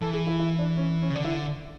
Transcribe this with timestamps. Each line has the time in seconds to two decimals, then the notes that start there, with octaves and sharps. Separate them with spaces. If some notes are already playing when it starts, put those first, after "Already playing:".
0.01 E3 A4
0.14 G#4
0.27 E4
0.39 E4
0.59 D4
0.77 C#4
1.02 C#4
1.10 C#3
1.15 D3 D4
1.24 E4